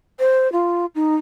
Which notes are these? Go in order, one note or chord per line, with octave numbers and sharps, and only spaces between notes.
C5
F4
D#4